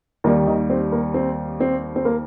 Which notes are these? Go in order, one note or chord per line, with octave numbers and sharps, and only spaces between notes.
D#2 D#3 G3 A#3
D#3 D#4
C4
A#3
C4
C4
C4
A#3